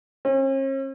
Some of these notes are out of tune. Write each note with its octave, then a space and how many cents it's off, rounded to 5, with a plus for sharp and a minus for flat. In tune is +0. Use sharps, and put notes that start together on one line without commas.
C#4 -45